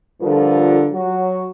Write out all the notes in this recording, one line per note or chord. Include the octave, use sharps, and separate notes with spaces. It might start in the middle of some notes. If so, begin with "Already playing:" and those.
G2 D3 F3 F4 A4 A#4
F#3 F#4